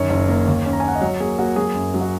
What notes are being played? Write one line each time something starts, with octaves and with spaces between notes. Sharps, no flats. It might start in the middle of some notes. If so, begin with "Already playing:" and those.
Already playing: F#2 D#3 C#5
F#1
A#3
D#2
C#4
A#5
G#5
C#4 F#5
D#5
F#3 C#5
A#3 G#4
A#3 F#4
F#3 G#4
F#2
F#3
F#4